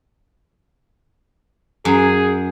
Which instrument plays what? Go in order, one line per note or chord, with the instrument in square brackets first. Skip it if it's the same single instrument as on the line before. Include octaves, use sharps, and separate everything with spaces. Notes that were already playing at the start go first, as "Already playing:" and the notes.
[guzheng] F#2 [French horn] G#4